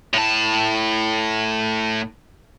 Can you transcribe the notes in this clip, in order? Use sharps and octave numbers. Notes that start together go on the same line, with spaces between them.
A2 A5